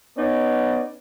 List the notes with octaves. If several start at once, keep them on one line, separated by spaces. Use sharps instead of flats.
B3 C#4 D#4 D5